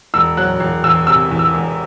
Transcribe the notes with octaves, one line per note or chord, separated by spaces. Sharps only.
E1 E6
F#3 F#6
E1
E2 E6
C3 E6
E2
E6
E1